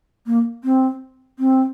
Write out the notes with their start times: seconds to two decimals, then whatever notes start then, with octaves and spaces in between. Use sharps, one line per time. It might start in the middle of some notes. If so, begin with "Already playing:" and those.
0.27 A#3
0.64 C4
1.39 C4